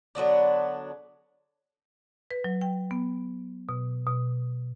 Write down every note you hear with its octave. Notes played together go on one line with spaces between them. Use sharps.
D3 F#3 B3 D4
B4
F#3
G5
B3
B2
B2